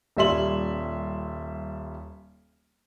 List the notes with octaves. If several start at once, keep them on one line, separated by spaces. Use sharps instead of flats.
D#1 G3 E5 C6 F#7